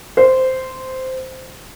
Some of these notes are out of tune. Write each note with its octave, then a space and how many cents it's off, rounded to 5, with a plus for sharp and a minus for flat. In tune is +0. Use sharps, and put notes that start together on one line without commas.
C5 -10